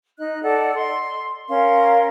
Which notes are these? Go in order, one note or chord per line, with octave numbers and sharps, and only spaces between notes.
D#4 D#5 F#6
A4 D5 D#5 F#5
C6
C#4 A#4 F5 C6